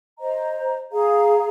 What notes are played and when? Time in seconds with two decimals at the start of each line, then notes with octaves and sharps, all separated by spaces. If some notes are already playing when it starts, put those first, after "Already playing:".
0.19 C5 D#5 A#5
0.92 G#4 F5 A#5